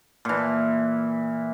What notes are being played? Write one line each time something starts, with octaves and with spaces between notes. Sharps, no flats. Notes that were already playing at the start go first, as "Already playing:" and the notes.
A#2 E3